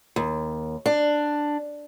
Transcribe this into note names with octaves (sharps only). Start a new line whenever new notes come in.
D#2
D4